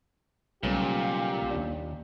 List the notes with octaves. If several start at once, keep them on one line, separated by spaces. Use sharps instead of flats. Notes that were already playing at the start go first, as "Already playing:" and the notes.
B1 A#2 C#3 G3 A3 G4
D#2 D4